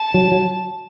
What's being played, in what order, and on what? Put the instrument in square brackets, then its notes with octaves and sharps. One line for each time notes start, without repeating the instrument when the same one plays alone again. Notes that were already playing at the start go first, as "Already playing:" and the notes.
Already playing: [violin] A5
[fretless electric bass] F#3
F#3